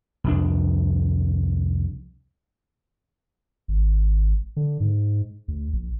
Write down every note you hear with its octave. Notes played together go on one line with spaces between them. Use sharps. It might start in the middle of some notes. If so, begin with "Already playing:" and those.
C2 F2 D4
G#1
D3
G#2
D2
A#1